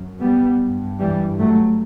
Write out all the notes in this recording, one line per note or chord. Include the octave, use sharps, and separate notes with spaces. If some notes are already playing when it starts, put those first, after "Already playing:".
Already playing: F#2
G3 B3
G2
E3 G3
F#3 A3